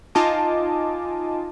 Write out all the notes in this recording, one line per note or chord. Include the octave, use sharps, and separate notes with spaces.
D#4 F4 D#5 G#5 A5 D6